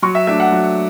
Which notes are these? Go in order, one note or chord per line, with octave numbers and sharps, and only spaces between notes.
F#3 C#6
E5
A3 D4 E5
F#5
F#3